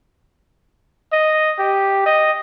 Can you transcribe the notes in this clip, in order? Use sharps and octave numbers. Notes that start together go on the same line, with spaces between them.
D#5
G4
D#5